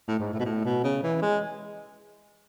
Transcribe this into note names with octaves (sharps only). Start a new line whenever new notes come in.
A2
G#2
A2
B2
A2
B2
C#3
E3
G#3